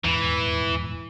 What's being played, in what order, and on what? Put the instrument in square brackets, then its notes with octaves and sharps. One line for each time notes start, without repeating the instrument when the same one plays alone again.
[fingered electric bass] D#1 E2 G#2 [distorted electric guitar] E3